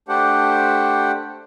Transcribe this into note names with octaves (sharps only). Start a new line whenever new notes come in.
A3 D4 G4 C5 F#5